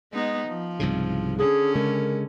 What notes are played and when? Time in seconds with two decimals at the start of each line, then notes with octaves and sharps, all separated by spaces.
0.13 G#3 B3 D#4
0.47 F3
0.80 C2 G#2 C#3
1.39 D3 C#4 G#4
1.75 C#3 G#3 A#4